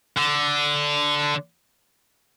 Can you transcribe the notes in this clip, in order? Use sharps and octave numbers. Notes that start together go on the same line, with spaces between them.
D3